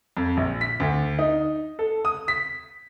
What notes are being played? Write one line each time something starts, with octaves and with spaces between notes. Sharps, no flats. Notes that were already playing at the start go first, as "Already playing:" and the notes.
F2
A#1
B6
D2
D#4
A4
D#6
B6